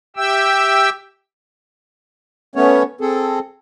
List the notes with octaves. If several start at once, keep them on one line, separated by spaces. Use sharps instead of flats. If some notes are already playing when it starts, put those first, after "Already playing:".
G4 E5 G5 E6
A3 B3 C#4 C#5
C4 G#4 A4